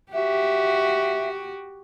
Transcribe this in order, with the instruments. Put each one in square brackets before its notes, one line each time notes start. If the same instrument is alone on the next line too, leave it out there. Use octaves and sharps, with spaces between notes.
[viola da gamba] F#4 G4 [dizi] E5